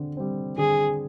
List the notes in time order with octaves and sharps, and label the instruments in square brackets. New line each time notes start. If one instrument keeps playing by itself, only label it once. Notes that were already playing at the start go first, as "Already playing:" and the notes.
Already playing: [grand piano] D3 C4
G3 C4
[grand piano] D3 [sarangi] G#4